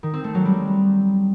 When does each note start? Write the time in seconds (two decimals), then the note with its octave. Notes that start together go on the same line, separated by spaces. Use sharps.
0.03 D#3
0.14 C4
0.24 A3
0.35 F#3
0.45 G3